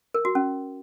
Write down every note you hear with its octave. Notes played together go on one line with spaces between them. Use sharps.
A#4
F#4
C#4